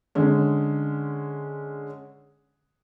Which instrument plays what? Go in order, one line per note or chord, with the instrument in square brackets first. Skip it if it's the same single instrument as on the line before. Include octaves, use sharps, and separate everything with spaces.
[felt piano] D3 G#3 C#4